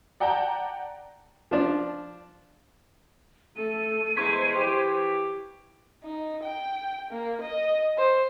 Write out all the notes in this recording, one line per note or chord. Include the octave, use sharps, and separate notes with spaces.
D5 F#5 G5 A5 A#5
F3 D4
A3 A4 D#7
E2 G#3 C5 C#6 G#6 B6
E3 G4
D#4
G5
A#3
D#5
C5